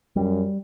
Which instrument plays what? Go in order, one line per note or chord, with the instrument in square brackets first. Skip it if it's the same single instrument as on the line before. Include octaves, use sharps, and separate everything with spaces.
[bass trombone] F#2 [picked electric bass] G3